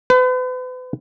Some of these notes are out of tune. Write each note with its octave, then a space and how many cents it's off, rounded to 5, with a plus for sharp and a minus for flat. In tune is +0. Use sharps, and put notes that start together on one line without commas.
B4 +40